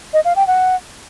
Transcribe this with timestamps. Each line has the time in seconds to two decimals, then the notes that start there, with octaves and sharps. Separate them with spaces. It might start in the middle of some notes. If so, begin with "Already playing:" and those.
0.13 D#5
0.25 F5
0.36 G5
0.47 F#5